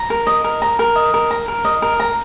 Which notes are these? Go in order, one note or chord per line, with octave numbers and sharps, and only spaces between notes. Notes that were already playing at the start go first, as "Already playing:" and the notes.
Already playing: A#5
A#4
D#5
A#4
A#5
A#4
D#5
A#4
A#5
A#4
D#5
A#4
A#5